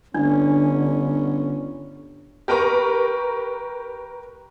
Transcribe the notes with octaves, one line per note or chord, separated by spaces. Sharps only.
G1 D3 C#4 D4
G4 A#4 B4 A#5 C#6